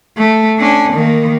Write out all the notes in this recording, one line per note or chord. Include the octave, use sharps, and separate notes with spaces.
A3
C#4 D4
D#3 A#3